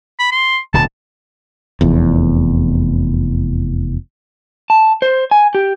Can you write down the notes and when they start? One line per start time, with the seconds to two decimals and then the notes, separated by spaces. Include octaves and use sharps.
0.19 B5
0.32 C6
0.74 D1 B2 D3 A5
1.81 F1 E2
4.70 A5
5.02 C5
5.31 G#5
5.55 G4